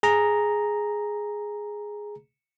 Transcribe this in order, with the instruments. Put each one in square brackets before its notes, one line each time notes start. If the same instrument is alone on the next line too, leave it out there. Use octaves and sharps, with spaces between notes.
[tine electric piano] G#4 A#5